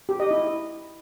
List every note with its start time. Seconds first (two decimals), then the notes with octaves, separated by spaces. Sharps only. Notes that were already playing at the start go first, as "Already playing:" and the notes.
0.09 G4
0.20 D#5
0.31 E4